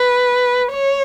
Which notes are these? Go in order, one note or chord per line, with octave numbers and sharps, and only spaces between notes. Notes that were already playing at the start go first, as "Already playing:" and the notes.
Already playing: B4
C#5